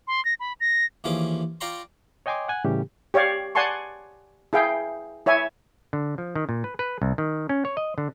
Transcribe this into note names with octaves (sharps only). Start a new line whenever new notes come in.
C6
A#6
B5
A#6
D#2 E3 F3 C#4 G#4 D6
F4 D5 G5 A#5 C6 C#6
C#5 D#5 G5 G#5 C6 D6
F#5 G#5 F#6
A2 C#3 E3 G3 C#4 G4
G4 C#5 D5 F5
D5 F#5 G#5 A5 C6 C#6
E4 G#4 F5 G5
E4 C#5 E5 G#5
D3
F3
D#3
A#2
B4
B4
C2
D#3
C#4
C#5
D#5
D3